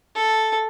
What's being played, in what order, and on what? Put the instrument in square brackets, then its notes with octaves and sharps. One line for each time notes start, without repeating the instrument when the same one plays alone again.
[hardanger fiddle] A4